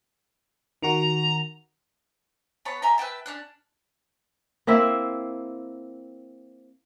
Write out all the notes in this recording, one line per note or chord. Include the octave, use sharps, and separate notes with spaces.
D#3 F#4 A#5
B3 B4 C#5 A5
D#5 E5 G#5 A#5
B4 E5 G5 A5
C#4 D4 F#6
A#3 C4 E4 E5